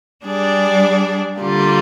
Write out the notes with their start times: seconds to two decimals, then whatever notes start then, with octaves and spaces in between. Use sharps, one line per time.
0.24 G3 D4 G#4 D5
1.40 D3 G3 A#3 F4